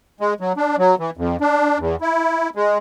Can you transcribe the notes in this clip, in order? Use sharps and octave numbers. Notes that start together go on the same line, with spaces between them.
G#3
F#3
D4
F#3
E3
F2
D4
E2
E4
G#3